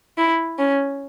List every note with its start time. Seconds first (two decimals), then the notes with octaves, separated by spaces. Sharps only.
0.17 E4
0.58 C#4